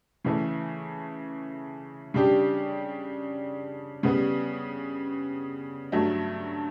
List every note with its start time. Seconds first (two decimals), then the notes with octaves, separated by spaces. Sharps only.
0.25 C#3 E3 A3
2.14 C#3 G3 D4 G4
4.03 C#3 G3 B3
5.92 G2 F#3 A3